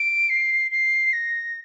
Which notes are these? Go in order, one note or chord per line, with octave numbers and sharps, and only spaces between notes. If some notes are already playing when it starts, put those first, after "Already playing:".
Already playing: D7
C7
C7
A#6